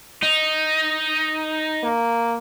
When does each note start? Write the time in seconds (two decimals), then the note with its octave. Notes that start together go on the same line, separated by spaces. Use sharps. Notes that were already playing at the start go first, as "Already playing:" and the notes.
0.22 D#4
1.83 A#3